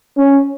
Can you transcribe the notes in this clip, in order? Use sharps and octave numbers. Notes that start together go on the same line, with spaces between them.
C#4